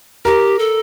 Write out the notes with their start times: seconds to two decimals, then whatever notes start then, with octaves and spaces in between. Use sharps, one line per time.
0.25 G4 A#4
0.59 A4